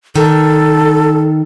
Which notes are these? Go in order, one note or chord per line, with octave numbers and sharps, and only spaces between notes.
D#3 A4